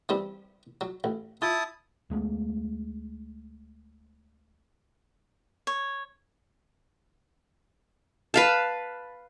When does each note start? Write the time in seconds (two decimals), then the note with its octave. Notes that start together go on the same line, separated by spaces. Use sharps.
0.09 E3 G3 C4
0.81 F#3
1.04 A1
1.42 E4 F4 A5 D#6
2.10 D2 G#3 A3 B3
5.67 C#5
8.34 B4 F5 A5